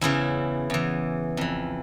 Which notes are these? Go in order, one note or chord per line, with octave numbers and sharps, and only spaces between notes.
E2 C#3 E3 E4
E2 E3
F2 E3